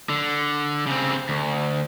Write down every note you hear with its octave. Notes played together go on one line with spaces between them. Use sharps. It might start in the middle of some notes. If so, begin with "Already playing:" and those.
D3
C#3 C4
D2